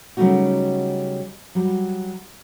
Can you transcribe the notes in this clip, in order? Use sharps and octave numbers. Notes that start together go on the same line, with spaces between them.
C#3 F#3 G3 A3 D#4 F#4
F#3 G3